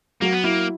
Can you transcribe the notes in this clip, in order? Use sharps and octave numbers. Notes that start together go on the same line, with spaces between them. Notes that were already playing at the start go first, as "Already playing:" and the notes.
F#3 A#3
B3
A#3 E4